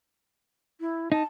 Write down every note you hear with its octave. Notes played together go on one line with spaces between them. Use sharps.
E4
D#4 A5